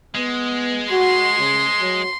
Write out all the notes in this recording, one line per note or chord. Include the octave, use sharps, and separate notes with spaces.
G#3 B3
F#4 C6
C#3
F#3